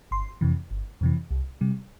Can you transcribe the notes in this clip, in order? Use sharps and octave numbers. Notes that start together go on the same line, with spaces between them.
G1 C6
F2 C3 E3
G1
F2 C3 E3
C2
C3 G3